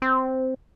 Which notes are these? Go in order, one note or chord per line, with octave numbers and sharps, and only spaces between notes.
C4